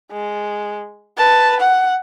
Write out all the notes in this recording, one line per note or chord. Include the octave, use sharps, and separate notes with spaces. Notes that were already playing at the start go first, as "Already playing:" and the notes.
G#3
B4 A5
F#5